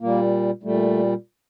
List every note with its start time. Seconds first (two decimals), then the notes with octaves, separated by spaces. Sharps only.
0.01 A#2 G3 A#3
0.63 A#2 G3 A3